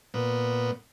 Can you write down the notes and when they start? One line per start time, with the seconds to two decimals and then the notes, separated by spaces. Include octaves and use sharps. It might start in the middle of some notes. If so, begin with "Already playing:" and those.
0.14 A#2 B3